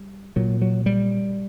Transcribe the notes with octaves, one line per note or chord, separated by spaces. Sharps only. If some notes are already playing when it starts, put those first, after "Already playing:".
Already playing: G3
A#2 F#3
F#3
G3